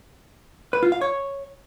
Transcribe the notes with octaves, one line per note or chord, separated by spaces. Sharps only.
B4
F4
F5
C#5